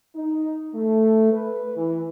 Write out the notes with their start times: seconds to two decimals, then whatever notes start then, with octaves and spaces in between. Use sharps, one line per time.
0.16 D#4
0.74 A3
1.32 B4
1.76 E3